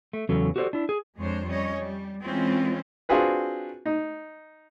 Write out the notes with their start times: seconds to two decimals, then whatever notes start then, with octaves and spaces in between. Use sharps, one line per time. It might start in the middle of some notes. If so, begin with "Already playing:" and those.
0.13 A3
0.29 E2 C#3 F#3 C#4 A4
0.56 F#4 G4 A4 B4 C5 D5
0.73 D4 E4
0.89 G#4
1.17 F2 G#3 D4 C5 C#5
1.47 G3 C#4 C#5 D#5
1.79 G3
2.24 E3 G#3 C4 C#4 F4
3.09 C4 D4 F4 F#4 G#4 B4
3.86 D#4